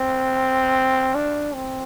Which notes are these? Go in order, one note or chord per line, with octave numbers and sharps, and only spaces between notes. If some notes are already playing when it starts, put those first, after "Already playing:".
Already playing: C4
D4
C4